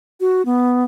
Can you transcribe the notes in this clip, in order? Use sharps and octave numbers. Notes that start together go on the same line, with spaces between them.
F#4
B3